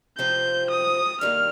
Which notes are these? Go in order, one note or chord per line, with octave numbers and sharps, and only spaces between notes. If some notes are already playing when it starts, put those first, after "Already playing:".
C3 F3 C4 F4 G6
D#6
G2 D#3 G3 A#3 F6